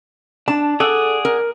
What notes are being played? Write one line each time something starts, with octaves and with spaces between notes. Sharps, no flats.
D4 A5
G#4 A4 D5 F#5
A#4